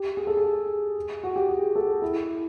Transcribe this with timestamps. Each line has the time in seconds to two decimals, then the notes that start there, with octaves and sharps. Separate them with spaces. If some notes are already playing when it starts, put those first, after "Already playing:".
Already playing: G4
0.17 G#4
0.27 A4
0.37 G#4
1.23 F#4
1.36 G4
1.49 G#4
1.76 A4
2.02 E4